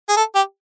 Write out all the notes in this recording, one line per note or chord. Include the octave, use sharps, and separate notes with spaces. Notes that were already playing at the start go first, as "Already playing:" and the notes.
G#4
A4
G4